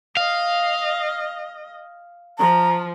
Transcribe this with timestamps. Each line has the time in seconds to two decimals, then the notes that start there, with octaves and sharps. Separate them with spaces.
0.17 D#5 F5
2.39 F3 A#5